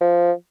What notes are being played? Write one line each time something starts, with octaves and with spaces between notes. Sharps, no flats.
F3